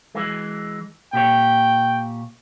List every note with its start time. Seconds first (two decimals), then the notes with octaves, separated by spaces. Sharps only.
0.15 E3 G#3
1.13 A#2 G4 C#5 G5